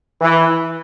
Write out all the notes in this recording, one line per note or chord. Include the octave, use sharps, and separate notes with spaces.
E3